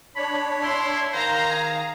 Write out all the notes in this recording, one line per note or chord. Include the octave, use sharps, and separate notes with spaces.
D4 C#5 B5
E4 C6
D#3 C5 F5 A#5
G#4